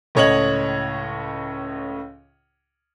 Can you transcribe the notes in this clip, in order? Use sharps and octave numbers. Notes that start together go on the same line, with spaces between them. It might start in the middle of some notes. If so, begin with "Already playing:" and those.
C#2 A2 C#5 D#5 G#6 F#7